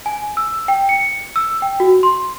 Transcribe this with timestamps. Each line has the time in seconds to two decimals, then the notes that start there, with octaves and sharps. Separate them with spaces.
0.06 G#5
0.37 E6
0.68 G5
0.89 C#7
1.36 E6
1.62 G5
1.80 F#4
2.03 C6